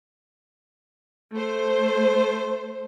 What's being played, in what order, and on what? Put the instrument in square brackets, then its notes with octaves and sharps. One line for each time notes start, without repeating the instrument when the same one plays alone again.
[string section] A3 C5